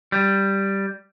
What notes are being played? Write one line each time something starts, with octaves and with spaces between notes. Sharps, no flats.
G3